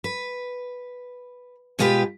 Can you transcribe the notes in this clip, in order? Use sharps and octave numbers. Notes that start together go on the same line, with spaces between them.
B4
B2 G#3 F4 G4 B4